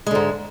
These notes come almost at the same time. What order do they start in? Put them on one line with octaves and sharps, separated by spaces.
G#3 D3 G#2